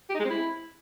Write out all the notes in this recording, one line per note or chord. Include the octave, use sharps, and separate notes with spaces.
G4
D#4
G#3
C4
E4